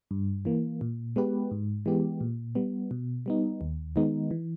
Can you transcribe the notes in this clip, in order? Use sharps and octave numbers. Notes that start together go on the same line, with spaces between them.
G2
E3 A#3
A#2
G#3 B3 G4 B4
G#2
E3 G#3 B3 G4
A#2
G3 B3
B2
G3 B3 D#4
D#2
D#3 G#3 B3 D#4
E3